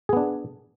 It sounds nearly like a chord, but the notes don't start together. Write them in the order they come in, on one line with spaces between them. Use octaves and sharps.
G#4 B3 D4